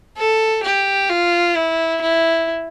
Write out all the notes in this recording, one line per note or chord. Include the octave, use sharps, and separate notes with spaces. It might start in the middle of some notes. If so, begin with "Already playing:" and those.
A4
G4
F4
E4
E4